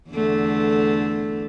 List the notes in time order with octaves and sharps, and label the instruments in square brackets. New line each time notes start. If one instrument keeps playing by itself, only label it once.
[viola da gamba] E2 D3 A3